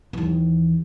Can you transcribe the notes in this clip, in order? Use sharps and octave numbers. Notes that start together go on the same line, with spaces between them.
D#2 E3